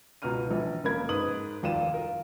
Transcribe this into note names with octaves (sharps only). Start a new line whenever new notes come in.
C#2 B2 A#5 F6 D#7
A#1 E3
F1 C#3 A#3 A#4 B5 G#6
G#2 B4 D#6 F#7
F1 D#2 F4 D5 D#7 E7
F4 A#4